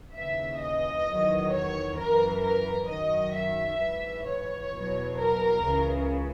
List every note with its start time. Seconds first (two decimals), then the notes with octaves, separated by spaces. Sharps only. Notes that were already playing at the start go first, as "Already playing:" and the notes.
0.15 D#2 C#3 E3 E5
0.61 D#5
1.06 E2 D#3 F#3
1.52 C#5
1.97 F#2 E3 A#4
2.43 A#4
2.89 F#2 D#3 F#3 D#5
3.34 E5
3.80 G#2 E3
4.27 C#5
4.71 E2 B2 F#3
5.18 A#4
5.63 C#2 C#3 E3